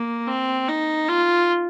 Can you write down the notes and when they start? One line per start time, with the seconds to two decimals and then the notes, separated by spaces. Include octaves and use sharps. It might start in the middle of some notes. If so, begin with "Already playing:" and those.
Already playing: A#3
0.27 C4
0.68 D#4
1.08 F4